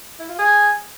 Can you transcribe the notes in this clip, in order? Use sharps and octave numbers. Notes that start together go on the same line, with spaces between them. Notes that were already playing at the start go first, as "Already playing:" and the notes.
E4
F4
G#4